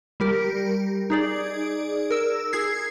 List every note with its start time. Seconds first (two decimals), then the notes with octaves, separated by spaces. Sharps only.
0.20 G3 G4 A#4
1.10 D#4 G#4 D5
2.11 A#4 E6
2.53 G#4 G#6 C7